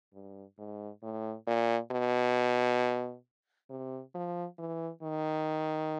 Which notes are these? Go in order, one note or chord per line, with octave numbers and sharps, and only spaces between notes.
G2
G#2
A2
A#2
B2
C3
F3
E3
D#3